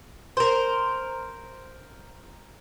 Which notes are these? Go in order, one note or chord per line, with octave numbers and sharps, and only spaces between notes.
A#4 C5